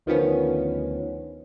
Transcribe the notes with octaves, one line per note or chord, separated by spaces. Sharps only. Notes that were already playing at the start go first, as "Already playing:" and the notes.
D2 D#3 F3 B3 C#4